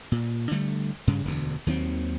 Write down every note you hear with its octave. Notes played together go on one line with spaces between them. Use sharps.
A#2
D3 G3 A3
G2 C#3
E1 D2 D3
D#2 D#3 F#3 C4